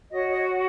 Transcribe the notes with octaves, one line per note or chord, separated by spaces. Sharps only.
F#4 C#5 D#5
D#5
C#5